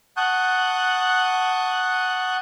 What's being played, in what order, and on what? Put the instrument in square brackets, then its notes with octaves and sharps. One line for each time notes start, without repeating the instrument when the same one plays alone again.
[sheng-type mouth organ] F#5 A5 C#6 D#6 F#6 G6